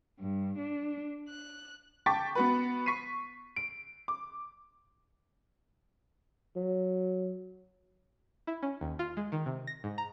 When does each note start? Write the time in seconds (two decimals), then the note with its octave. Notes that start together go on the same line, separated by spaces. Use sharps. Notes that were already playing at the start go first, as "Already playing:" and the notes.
0.20 G2
0.58 D4
1.28 F#6
2.06 G5 A5 C#6 D6 A6 B6
2.35 B3 F#4 B4
2.86 C#6 B6 C7 D#7
3.56 D7
4.08 D6
6.56 F#3
8.47 E4
8.63 C#4
8.81 D#2
8.99 F4
9.17 G#3
9.32 D#3
9.46 C3
9.67 A#6
9.84 G#2
9.98 A#5